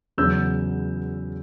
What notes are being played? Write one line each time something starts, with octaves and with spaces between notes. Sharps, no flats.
E2 C#3 F#3 E6 G6